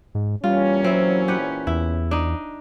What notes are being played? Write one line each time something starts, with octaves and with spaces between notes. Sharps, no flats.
G#2
A#2 E3 G3 C#4 F4
F#3 C4 E4
G4 B4 F#5
E2 E4
D4 D#4